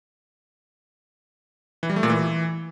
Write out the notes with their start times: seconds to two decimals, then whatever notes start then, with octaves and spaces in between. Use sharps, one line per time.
1.83 E3
1.90 G3
1.96 A3
2.03 A#2
2.10 E3